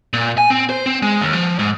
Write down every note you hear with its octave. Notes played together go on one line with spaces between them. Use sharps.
A#2
G#5
C4
C5
C4
G#3
D#2
F3
G#2